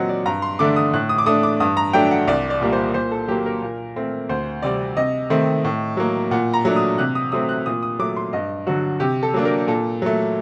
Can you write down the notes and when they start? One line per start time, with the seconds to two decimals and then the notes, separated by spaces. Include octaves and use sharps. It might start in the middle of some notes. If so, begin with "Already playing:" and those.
Already playing: A#2 F#3 C4 D#5 F#5
0.09 D5
0.26 G2 A#5
0.42 C6
0.59 D3 A3 D4 D6
0.76 D#6
0.93 A2 F#6
1.09 D#6
1.18 D6
1.26 A3 D4 D#6
1.43 D6
1.60 G2 D#6
1.77 A#5
1.93 F#3 A3 D4 G5
2.11 F#5
2.28 C2 D5
2.50 D5
2.61 A#2 G3 A#3
2.73 C5
2.94 A#2 C5
3.12 A4
3.28 F#3 A#3 G4
3.46 A#4
3.62 A#2
3.96 A3 C4
4.29 D2 C5
4.62 C3 G3 C4 D5
4.97 C3 D#5
5.30 D#3 A3 C4
5.65 A2
5.97 F#3 A#3
6.31 A#2 F#5
6.54 A#5
6.65 F#3 A3 D4
6.76 D#6
6.98 C3 F#6
7.15 D#6
7.32 F#3 A3 C4 D#6
7.49 F#6
7.66 A#2 D#6
7.82 D#6
7.99 F#3 A3 D6
8.16 C6
8.33 G2 D#5
8.67 D3 F#3 F#4
9.00 C3 G4
9.23 A4
9.34 F#3 A#3 D4
9.45 A#4
9.68 A#2 A4
10.02 F#3 A3